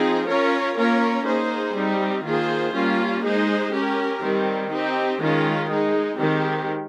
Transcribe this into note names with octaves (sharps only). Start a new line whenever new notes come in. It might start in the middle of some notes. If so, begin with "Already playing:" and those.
Already playing: F3 C4 D#4 G#4
C#4 F4 A#4 C#5
A#3 C#4 F4 A#4 C#5
A#3 D#4 G#4 C5
G3 C4 D#4
D#3 A#3 F4 G#4 C5
G3 A#3 C#4 F4
G#3 D#4 G#4 C5
C#4 G4 A#4
D#3 G3 C4
C4 D#4 G4
D#3 G#3 C#4 F4
G#3 D#4 G#4
D#3 G#3 C4 G4